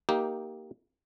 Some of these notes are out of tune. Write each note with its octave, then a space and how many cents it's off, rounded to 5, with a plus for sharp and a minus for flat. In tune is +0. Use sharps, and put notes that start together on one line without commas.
A#3 +0 D#4 +20 G4 -5